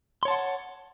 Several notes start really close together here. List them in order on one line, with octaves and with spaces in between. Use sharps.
C6 C#5 A5 F#5